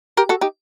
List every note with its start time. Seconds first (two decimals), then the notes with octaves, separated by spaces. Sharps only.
0.17 G4 A#4
0.29 F#4 A4
0.41 D#4 G4